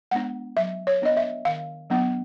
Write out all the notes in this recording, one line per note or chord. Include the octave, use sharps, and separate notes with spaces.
G#3 B3 D4 F#5
F#3 E5
C#5
B3 D4 D#5
E5
D#3 F5
F#3 B3 D4